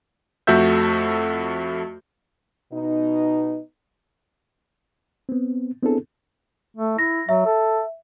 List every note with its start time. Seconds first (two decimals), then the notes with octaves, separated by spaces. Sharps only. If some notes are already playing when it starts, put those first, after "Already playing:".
0.47 F2 A3 F#4 A4 E5 G6
2.72 B2 B3 D#4
5.29 B3 C4
5.82 B3 C4 D4 E4 G#4 A4
6.77 A3
6.98 E4 A#6
7.29 F#3 E5
7.45 A4